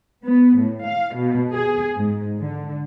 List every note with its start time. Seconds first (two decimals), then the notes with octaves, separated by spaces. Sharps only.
0.24 B3
0.56 A2
0.86 F5
1.15 B2
1.52 G#4
1.94 G#2
2.39 D3